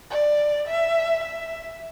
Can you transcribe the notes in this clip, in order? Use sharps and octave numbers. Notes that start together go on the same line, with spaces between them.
D5
E5
E5